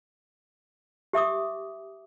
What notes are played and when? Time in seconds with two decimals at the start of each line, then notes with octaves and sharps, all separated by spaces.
1.13 G4 E5 D6 D#6